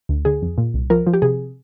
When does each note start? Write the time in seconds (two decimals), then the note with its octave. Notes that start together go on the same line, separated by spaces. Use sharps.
0.09 D2
0.25 D3 G#4
0.42 F2
0.58 A#2
0.74 C2
0.90 F3 A#4
1.07 F3
1.14 G4
1.22 C3 G#4